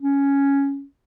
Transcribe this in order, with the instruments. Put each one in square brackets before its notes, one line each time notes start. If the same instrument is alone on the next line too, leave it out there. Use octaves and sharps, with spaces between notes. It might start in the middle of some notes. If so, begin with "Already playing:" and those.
[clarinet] C#4